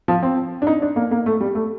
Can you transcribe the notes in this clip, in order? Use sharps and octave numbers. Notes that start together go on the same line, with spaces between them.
F3
C4
D4
D#4
D4
A#3
A#3
A3
G3
A3